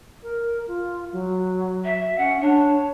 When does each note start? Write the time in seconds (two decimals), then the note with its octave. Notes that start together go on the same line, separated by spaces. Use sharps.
0.23 A#4
0.68 F4
1.12 F#3
1.85 E5
2.18 C#4 F#5
2.42 D4 C#5